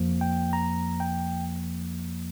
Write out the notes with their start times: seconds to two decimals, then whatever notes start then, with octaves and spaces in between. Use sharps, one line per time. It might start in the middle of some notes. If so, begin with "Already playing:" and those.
Already playing: F2 F3 A#3
0.21 G5
0.53 A#5
1.00 G5